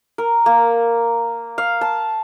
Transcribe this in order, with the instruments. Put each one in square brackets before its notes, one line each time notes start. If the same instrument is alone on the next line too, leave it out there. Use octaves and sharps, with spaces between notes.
[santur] A#4
A#3
F5
A5